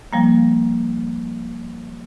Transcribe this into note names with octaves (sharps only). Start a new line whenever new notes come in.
F3 G3 A#3